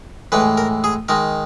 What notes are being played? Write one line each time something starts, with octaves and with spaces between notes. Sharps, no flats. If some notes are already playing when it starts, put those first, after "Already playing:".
A2 E3 G#3 B4
A#4
G#4
D#3 G#3 A#4